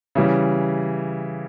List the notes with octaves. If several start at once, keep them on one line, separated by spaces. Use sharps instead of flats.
C#3 E3 G3